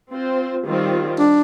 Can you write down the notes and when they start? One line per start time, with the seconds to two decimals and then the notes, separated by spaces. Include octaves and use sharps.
0.10 C4 F4 C5
0.65 D#3 G3 C4 F4
1.19 D4